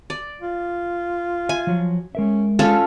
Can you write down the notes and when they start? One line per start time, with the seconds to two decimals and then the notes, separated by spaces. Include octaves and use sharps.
0.10 D5
0.42 F4
1.49 E5 G#5
1.67 F3 F#3
2.15 G#3 C#4 A#4 E5
2.59 C#4 F4 G#4 A4